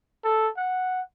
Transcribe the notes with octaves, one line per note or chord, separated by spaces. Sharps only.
A4
F#5